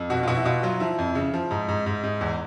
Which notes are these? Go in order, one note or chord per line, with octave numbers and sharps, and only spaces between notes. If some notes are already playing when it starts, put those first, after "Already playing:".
Already playing: F2
B2 F#4
F4
B2 F#4
E4
B2 F4
F#3 F4
F3 E4
F2
C#3
F3
G#2
G#2
G#2
G#2
E2